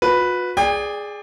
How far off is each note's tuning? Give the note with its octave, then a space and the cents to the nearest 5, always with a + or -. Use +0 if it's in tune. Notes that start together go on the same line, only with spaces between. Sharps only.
F#4 -45 B4 +0
G#4 +0 D5 +0 G5 +40